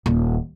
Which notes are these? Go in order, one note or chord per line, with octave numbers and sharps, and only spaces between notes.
D#1